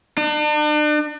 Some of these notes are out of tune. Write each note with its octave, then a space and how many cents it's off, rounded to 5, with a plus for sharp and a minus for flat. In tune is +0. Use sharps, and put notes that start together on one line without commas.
D4 +40